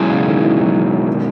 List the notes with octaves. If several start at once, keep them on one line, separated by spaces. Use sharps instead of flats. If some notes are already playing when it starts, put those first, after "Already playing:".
Already playing: B2 E3 F#3 G#3 C#4 G#4
C#3
D#3
E3
F#3
E3
D#3